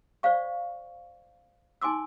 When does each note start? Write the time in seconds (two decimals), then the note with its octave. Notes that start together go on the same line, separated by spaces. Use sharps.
0.23 C5 D5 F5 C#6
1.82 D#4 G#5 C6 D6 E6